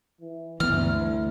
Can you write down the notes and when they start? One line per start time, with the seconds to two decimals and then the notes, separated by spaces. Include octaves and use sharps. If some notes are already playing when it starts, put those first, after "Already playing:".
0.21 E3
0.60 D2 G2 E3 B3 E4 F6